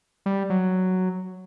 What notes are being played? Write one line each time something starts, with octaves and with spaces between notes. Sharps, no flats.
G3
F#3